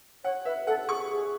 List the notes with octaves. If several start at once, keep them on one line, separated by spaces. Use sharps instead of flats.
C#5 F#5
B4 E5
A4 F#5
G#4 C#6
G#4